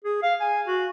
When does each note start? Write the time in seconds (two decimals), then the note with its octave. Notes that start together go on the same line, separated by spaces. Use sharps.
0.04 G#4
0.23 F5
0.40 G#5
0.67 F#4